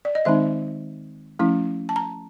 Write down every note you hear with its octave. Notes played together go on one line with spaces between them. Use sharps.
D5
D#5
D#3 G#3 C4 D#4 E5
F3 A3 C#4 E4
A5
A#5